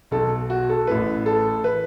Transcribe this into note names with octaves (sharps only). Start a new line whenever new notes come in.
B1 B2 A4
F#4
A4
A1 A2 E3 B4
A4
E3 B4